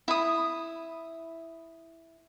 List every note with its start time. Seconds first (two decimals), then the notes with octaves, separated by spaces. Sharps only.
0.08 E4 D#6